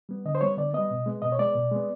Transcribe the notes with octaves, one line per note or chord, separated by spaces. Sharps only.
G3 B3
D3 D#5
C5
G3 B3 C#5
D3 D5
G3 B3 D#5
B2
G#3 B3
B2 D#5
C#5
G#3 B3 D5
B2
G#3 B3